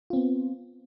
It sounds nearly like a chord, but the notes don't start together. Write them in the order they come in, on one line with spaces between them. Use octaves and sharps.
F4 C4 B3